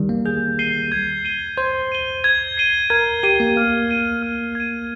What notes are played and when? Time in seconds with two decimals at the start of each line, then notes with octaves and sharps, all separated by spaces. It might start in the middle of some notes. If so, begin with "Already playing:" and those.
Already playing: D#3 G3
0.09 A#3
0.26 G#4 G6
0.59 C7 D#7 G7
0.92 G#6
1.25 D#7 G7
1.58 C5 G#6
1.92 D#7 G7
2.24 G#6
2.57 C7 D#7 G7
2.90 A#4 G#6
3.23 G4 C7 D#7 G7
3.40 A#3
3.56 A#3 F6
3.89 G#6 D#7
4.23 F6
4.55 G#6 D#7